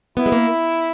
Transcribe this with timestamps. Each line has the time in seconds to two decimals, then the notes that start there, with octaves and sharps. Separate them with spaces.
0.17 B3 E4
0.26 G#3
0.32 A#3